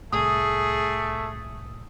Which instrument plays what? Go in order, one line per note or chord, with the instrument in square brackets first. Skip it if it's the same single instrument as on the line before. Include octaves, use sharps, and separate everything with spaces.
[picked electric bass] C2 A2 [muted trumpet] A3 [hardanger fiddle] G#4 [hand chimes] D#6